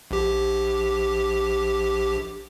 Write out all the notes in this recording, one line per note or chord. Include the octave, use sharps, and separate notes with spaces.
A#1 G4